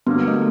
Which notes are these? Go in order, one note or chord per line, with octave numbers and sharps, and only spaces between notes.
G2 D3 F#3 A#3 B3
A3